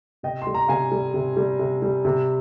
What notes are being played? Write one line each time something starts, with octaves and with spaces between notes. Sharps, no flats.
C3 D#5 G5
C6
G3
A#5
C3 F5 G#5
G3
C3
G3
C3
G3
C3